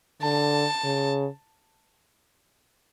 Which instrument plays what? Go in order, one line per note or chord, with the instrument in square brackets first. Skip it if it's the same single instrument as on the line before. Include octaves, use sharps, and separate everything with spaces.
[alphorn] D3 [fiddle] A5
[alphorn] C#3